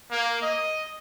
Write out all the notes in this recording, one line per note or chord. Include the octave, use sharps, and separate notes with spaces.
A#3
D#5